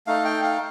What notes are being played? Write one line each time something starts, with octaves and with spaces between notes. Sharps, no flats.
A3 D#4 F5
G5
F5